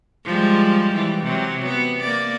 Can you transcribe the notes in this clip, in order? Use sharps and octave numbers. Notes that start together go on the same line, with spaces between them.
F3 G3 G#3
E3 G3
C3 F#3
B3
A#3 D5